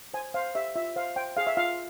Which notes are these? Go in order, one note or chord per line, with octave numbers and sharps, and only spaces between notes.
C5 G#5
C5 F5
G4 E5
F4 E5
C5 F5
C5 G5
G#4 F5
E5
F4 F5